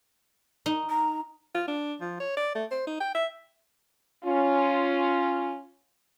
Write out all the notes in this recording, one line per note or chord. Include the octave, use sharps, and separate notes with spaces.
D#4
A#5
F4
D4
F3
C#5
D5
A3
C5
D#4
G5
E5
C#4 F4